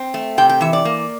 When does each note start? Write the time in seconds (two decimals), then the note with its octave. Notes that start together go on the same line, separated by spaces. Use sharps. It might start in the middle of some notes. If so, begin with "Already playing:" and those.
Already playing: C4
0.14 A3
0.38 C3 G5
0.49 G5
0.61 E3 E5
0.73 D5
0.85 A#3